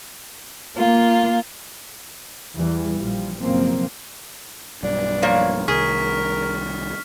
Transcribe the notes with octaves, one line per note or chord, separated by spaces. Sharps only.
A#3 F4
E2 E3 G3
A#1 F3 G3
F#1 F#2 B2 F3 A#3 C4
B1 G2 D4
F3 A#3 C#5
C2 D#3 G#4 A#4 C#6 F6 B6